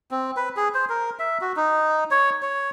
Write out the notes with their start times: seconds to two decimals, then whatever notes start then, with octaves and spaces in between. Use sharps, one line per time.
0.11 C4
0.37 B4
0.57 G#4
0.74 C5
0.89 A#4
1.19 E5
1.41 F#4
1.56 D#4
2.11 C#5
2.42 C#5